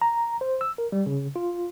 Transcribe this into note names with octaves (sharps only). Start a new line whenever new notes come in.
A#5
C5
E6
A#4
G3
C#3
F4